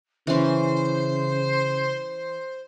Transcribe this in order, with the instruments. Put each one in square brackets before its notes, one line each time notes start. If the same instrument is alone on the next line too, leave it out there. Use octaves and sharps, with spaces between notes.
[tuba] C#3 [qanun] E3 C#4 [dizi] C5